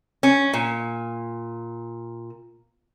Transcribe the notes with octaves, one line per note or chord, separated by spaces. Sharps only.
C#4
A#2